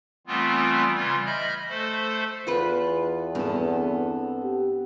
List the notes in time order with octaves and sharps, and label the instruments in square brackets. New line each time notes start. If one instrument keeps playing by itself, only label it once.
[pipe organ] E3 G3 A3 B3 C4 F4
C#3 E3 G3 F4 G#6
D#5 E5 B5 F6 G6
A3 A4 C5
[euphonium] E2 [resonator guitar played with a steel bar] F4 B4
[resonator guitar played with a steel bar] G2 [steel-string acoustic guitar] B3 C4 A4
[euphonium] G4